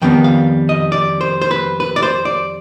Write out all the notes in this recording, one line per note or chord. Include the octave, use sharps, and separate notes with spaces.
F2 D#3 G3 B3 G5
F5
D#5
D5
C5
C5
B4
B4
D5
C5
D5